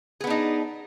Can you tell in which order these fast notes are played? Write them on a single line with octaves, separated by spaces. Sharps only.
G#4 B3 D4 D#4